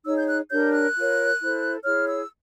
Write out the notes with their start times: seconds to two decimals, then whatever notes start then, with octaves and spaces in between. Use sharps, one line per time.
0.05 D#4 G#4 C#5 E6
0.16 G6
0.28 F#6
0.50 D4 G4 A#4 C#5 G6
0.73 F#6
0.95 F4 A#4 C#5
1.40 E4 A4 C5
1.85 E4 G#4 C#5 F6
2.08 E6